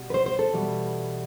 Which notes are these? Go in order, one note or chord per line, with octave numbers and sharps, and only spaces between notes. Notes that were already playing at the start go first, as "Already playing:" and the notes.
Already playing: B2 G3
B4
C5
C5
A4
E2 B2 G3